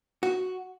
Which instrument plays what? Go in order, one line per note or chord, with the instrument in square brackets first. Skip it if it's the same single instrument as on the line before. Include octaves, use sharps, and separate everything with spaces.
[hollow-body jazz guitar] F#4